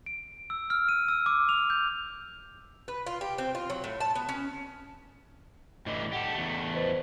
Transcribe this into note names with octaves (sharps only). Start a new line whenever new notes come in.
D7
E6
F6
D#7
E6
D6
F7
G6
B4
F4
G4
C4
F4
F#3
A2
A5
B3
C#4
A2 D3 E3 D#5
G4 A4 F#5
E2 A3
B4 C5 D#5